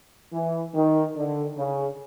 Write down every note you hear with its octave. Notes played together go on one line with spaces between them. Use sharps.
E3
D#3
D3
C#3